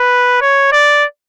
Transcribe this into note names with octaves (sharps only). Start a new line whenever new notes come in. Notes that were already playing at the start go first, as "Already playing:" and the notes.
Already playing: B4
C#5
D5